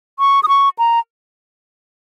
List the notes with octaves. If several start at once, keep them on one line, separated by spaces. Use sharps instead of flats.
C#6
D#6
C#6
A#5